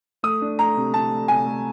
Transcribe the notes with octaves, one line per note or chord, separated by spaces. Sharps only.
A3 D#6
D4
A3 A#5
C3
C3 A5
A3
C3 G#5
A3